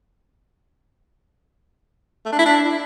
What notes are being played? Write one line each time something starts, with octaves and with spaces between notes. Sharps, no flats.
A3
D4
E4
D4